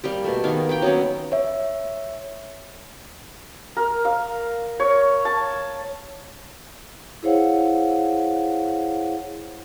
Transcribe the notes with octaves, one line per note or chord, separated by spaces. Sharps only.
G3 A#3 G4
B2 A3
D#3 A#3 B3
A#3 G5
F#3 B3 C#4
C#5 E5
A#4
F5
C#5
A5
E4 G#4 C5 C#5 F5 F#5